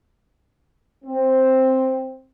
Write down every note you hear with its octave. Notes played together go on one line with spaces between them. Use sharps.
C4